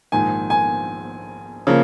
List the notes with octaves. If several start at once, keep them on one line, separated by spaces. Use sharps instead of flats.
A#1 G#2 D#3 G#5
G#5
C#3 F3 A#3